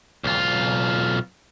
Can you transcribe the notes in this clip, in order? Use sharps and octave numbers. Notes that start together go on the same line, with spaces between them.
B1 F4